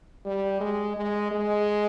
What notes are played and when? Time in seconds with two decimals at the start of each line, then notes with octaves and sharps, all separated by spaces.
0.25 G3
0.60 G#3
0.97 G#3
1.31 G#3